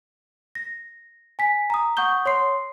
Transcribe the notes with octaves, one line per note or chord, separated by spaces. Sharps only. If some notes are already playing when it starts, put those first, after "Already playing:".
A#6
G#5 B6
A#5 D#6
F#5 C#6 D#6 G6 G7
C#5 C6 C7